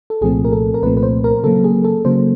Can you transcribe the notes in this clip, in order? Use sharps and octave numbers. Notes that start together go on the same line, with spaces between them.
A4
C2 A#2 F3 A3 C4 G#4
A#4
A4
A#4
C2 A#2 F3 A3 C4 B4
B4
C5
A#4
C#3 F#3 A#3 A4
G#4
A4
C#3 F#3 A#3 C5